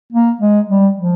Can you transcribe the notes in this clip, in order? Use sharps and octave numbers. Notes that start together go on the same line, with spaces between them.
A#3
G#3
G3
F3